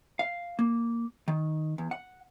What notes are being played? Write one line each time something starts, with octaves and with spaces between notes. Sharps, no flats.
F5
A#3
D#3
E2
F#5